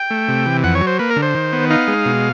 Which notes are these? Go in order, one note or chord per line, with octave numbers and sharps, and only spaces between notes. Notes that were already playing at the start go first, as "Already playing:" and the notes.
Already playing: G5
A3
C3
E3
F2 F#5
C#5
F#3
C5
A#3 B4
A#4
D3
C5
D#3
B3
D#4 F5
G#3
B2